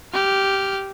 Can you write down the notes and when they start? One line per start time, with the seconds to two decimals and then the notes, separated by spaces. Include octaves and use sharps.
0.13 G4 F6